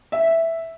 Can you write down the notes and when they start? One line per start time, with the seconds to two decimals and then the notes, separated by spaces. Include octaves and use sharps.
0.12 E5